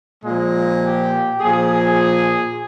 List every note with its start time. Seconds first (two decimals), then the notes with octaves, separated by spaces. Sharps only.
0.23 A#2 F3 G#3
0.82 G4
1.40 A#2 F3 G#4
1.70 G#4